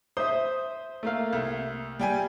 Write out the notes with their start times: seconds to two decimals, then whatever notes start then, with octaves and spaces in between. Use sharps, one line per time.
0.17 C5 E5 D#6
1.03 A3 A#3 F5
1.33 C2
1.99 G3 G5 G#5